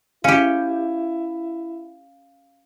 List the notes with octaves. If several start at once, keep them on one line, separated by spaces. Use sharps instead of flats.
C#4 E4 G4 F5